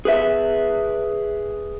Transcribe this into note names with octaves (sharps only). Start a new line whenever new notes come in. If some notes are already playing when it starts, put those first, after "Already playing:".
G#4 B4 E5